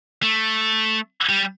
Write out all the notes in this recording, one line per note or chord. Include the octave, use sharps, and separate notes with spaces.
A3
G3